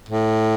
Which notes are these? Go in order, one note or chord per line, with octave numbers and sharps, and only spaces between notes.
A2